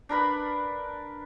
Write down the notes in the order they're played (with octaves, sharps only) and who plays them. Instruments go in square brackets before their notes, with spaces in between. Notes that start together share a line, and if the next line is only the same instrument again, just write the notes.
[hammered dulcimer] D4 A#4 B4 B5